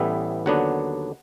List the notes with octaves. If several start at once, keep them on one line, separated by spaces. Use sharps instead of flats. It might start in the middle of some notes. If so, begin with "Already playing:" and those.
Already playing: A1 A2 E3 G3 B3 E5
D#2 D3 F#3 B3 D4 F#5